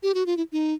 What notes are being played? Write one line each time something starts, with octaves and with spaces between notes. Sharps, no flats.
G4
F#4
F4
E4
D#4